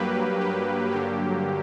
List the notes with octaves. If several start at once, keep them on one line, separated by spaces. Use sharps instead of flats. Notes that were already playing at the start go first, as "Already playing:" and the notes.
Already playing: G2 F#3 A#3 G4 B4
G4
G2 D3 F#3 A#3 G4